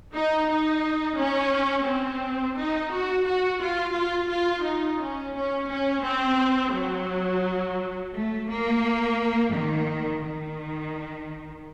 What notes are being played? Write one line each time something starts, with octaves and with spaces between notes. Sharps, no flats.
D#4
D#4
C#4
C4
D#4
F#4
F#4
F4
F4
F4
D#4
C#4
C#4
C#4
C4
F#3
A3
A#3
D#3
D#3